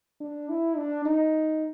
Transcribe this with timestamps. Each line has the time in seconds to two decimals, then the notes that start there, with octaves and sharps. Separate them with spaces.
0.20 D4
0.49 E4
0.77 D4
1.05 D#4